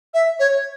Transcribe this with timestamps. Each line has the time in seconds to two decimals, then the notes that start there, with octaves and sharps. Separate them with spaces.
0.14 E5
0.40 C#5